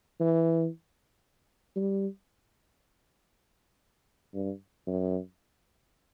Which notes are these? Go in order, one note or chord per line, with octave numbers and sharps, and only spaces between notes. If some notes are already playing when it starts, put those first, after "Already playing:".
E3
G3
G2
F#2